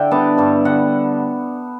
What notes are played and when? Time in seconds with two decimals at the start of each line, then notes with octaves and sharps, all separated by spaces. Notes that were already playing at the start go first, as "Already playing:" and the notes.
Already playing: D3 D5 E5 G5
0.11 G3 B3 D4 A5
0.38 G2 A5
0.65 D3 G3 F#5